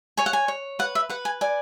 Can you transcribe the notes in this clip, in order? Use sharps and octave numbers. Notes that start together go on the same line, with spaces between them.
C#5 G#5
F#5
G#5
C#5
B4 F#5
E5
B4 F#5
G#5
D5 G#5